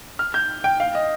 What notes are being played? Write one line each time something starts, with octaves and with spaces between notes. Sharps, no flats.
F6
G6
G5
F5
D#5